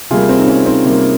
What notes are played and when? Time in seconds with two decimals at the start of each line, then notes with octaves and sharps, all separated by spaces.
0.10 C3 G3 A#3 F4 G#4
0.29 C4
0.38 D#4
0.47 C#4
0.65 C4 D#4
0.84 C3 G3 A#3